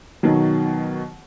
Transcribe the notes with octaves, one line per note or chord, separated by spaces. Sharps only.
B2 D#3 F#3